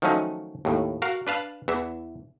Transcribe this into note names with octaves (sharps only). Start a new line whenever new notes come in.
D#3 F3 F#3 A3 C#4 D#4
D#2 A2
F#4 A#4 F5
D4 B4 F5 A5
E2 E3 E5